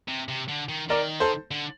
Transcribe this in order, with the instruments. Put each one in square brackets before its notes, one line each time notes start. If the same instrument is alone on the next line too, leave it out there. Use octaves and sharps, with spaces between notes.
[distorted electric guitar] C3
C3
D3
D#3
[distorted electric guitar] D#3 [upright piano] A#4 D5
[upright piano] A4 C5
[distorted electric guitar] D3